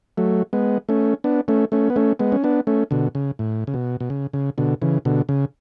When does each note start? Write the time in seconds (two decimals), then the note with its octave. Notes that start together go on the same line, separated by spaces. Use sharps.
0.18 F#3 A3
0.53 G#3 B3
0.89 A3 C#4
1.24 B3 D4
1.48 A3 C#4
1.72 A3 C#4
1.90 B3
1.96 A3 C#4
2.19 G#3 B3
2.32 C#4
2.44 B3 D4
2.67 A3 C#4
2.91 B2 D3
3.15 C#3
3.39 A2
3.67 C#3
3.74 B2
4.00 B2
4.10 C#3
4.33 C#3
4.58 B2 D3
4.82 C#3 E3
5.05 B2 D3
5.29 C#3